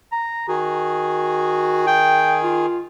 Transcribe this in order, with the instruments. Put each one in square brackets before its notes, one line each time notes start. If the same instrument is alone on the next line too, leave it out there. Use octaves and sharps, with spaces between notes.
[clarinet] A#5
[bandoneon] D#3 G#4 [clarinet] F#4
[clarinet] G5
F4